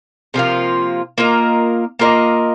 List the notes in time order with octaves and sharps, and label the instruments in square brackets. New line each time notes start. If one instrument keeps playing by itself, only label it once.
[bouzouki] C3 F3 A#3 F4
A#3 F4 A#4 D#5
A#3 F4 A#4 D#5